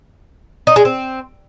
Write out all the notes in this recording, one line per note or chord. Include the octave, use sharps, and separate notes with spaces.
D#4
G#3
C4